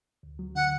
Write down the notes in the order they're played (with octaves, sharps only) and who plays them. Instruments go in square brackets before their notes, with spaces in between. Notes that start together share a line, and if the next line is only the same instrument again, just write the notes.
[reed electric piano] D2
F#3
[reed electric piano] D3 [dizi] F#5